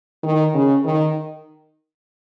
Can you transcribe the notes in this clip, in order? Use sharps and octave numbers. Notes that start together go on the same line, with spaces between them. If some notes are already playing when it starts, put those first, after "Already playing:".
D#3
C#3
D#3